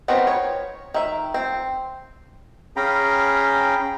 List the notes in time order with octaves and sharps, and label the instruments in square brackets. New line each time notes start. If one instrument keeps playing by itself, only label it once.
[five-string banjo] B3 C4 D#4 F#4 A#4
C#5
D#3 E5
C4
[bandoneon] C#4 G#4 F5 G5 A#5 B5